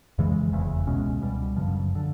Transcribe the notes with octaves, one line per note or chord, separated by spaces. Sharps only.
F2 C#3 E3 G#3
F1 E2 C#3 E3
C#2 B2 G#3 C#4
C#2 B2 G3
G1 F#2 C#3 F3
D3